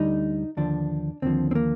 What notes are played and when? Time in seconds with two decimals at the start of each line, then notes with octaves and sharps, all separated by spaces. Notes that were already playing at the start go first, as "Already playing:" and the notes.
Already playing: D2 D3 G3 D#4
0.57 D#2 D3 F3 D4
1.22 D#2 D3 F3 C4
1.51 C4
1.55 A#3